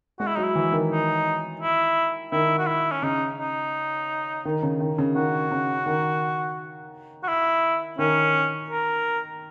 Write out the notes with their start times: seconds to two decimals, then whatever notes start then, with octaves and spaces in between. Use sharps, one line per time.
0.19 G#3 F#4
0.27 E4
0.36 F#3 D#4
0.44 E4
0.55 E3
0.72 D#3
0.91 D#4
1.62 E4
2.32 D#3 E4
2.59 F#4
2.67 E4
2.92 C#4
3.02 C#3 D#4
3.38 D#4
4.45 D#3
4.63 C#3
4.80 D#3
4.98 C#3
5.15 D#3 F#4
5.51 C#3
5.86 D#3
7.23 F#4
7.28 E4
7.99 D#3 C#4
8.70 A#4